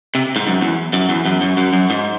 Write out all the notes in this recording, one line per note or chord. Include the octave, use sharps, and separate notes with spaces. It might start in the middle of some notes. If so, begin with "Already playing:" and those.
C3
G#2
F#2
E2
F#2
E2
F#2
F#2
F#2
F#2
G#2